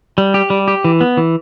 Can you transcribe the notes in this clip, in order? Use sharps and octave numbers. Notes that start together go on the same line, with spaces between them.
G3
G4
G3
G4
E3
B3
E3